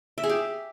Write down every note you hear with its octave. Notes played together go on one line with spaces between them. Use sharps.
E5
G#4
G4